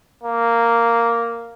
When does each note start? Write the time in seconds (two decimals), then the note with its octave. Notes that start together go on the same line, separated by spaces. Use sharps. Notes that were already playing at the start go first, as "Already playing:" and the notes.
0.23 A#3